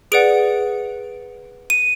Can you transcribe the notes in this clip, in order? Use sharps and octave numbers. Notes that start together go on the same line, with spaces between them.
G#4 B4 D5 F#5 D7
D#7